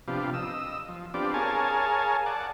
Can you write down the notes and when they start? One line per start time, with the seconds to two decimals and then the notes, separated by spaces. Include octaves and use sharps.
0.08 C3 F3 B3 D4 F4 G4
0.34 D#5 E6
0.88 F3
1.14 B3 C4 D4 F4 G4 D5
1.34 G#4 A#4 C#5 F5 G#5 A5
2.26 D5 F#5 A5